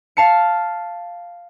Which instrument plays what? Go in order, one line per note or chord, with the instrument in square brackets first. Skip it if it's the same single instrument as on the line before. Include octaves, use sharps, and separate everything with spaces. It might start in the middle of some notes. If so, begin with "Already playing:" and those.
[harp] F5 A5 C#7